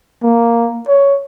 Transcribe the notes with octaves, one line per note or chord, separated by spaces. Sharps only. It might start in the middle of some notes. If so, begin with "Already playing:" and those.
A#3
C#5